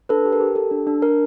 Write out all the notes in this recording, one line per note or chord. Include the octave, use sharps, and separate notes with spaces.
D4 A4 B4
G4
A#4
G4
G4 A4
D4
D4
D4 A#4